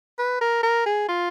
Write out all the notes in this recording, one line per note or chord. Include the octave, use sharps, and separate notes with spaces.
B4
A#4
A#4
G#4
F4